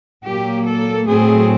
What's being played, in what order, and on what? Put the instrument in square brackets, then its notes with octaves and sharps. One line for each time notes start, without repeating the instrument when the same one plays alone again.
[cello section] A#2 F#3 A#3 G4
A4
A2 F#3 A3 C4 G#4